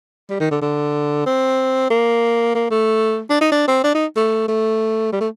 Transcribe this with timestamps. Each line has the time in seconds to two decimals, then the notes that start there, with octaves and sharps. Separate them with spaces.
0.30 G3
0.40 D#3
0.51 D3
0.62 D3
1.26 C4
1.90 A#3
2.55 A#3
2.71 A3
3.30 D4
3.41 D#4
3.52 D4
3.68 C4
3.84 D4
3.94 D#4
4.16 A3
4.48 A3
5.12 G3
5.20 A3